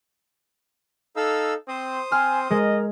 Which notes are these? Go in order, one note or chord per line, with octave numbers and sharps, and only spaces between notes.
D#4 A4 F5 E6
C4 C5 D#6
C4 G#5 F6
G#3 A#4 D#5